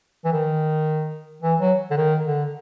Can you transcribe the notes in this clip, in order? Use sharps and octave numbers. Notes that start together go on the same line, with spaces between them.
E3
D#3
E3
F#3
D3
D#3
D3